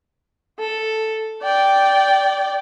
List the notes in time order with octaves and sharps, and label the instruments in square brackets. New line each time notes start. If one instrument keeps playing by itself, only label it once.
[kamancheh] A4
D5 G5